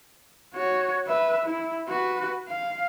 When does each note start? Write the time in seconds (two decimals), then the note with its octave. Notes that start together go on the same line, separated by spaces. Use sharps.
0.54 F#4 C#5
1.07 B4 E5
1.46 E4
1.89 F#4 B4
2.48 F5